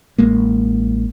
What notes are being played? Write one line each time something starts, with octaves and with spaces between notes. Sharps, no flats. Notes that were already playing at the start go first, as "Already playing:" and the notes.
A1 G#3 A#3